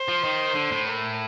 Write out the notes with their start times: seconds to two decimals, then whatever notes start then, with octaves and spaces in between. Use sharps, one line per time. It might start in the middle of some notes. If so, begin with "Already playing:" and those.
Already playing: C5
0.08 F3
0.24 D#3
0.55 D3
0.72 A2
0.86 A#4